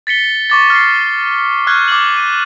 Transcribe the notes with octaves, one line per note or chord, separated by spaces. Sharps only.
A6 B6 C#7 G7
C#6 D6 A6
F6 C7
C#6 F6 F#6 G#6
D6 F6 F#7
D#7